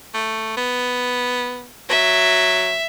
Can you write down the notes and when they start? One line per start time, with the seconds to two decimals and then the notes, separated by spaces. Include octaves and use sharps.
0.14 A3
0.57 B3
1.90 F#3 E5